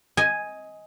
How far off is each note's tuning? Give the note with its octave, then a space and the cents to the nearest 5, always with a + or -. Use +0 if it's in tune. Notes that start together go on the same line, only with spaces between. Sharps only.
D#5 +15 G#5 +0